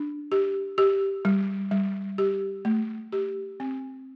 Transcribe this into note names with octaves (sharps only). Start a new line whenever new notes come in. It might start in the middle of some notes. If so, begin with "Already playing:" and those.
Already playing: D4
G4
G4
G3
G3
G4
A3
G4
C4